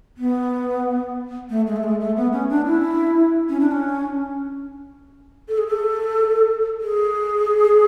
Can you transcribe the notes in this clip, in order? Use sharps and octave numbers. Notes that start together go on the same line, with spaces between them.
B3
A3
G#3
A3
G#3
A3
B3
C#4
D4
E4
C#4
D4
C#4
A4
G#4
A4
G#4